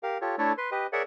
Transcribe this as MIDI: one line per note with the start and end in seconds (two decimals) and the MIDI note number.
0.03 0.18 67
0.03 0.18 70
0.03 0.18 77
0.21 0.35 65
0.21 0.35 67
0.21 0.35 69
0.21 0.35 73
0.38 0.53 57
0.38 0.53 62
0.38 0.53 64
0.38 0.53 69
0.38 0.53 73
0.58 0.70 71
0.58 0.70 84
0.71 0.87 67
0.71 0.87 71
0.71 0.87 75
0.93 1.03 68
0.93 1.03 70
0.93 1.03 73
0.93 1.03 74
0.93 1.03 76
0.93 1.03 78